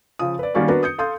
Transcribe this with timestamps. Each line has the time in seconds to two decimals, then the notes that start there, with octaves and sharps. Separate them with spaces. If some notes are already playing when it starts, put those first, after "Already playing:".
0.19 C#3 F3 D#6
0.39 B4 D5
0.54 D#3 G3 A#3 C#4 F#4 D5
0.68 B3 D4 F#4 A#4 B4
0.83 D#6 G6 C#7
0.98 A4 F5 C6 D#6 G6